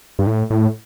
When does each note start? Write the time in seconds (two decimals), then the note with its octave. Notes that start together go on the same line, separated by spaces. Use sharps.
0.19 G2
0.27 A2
0.50 A2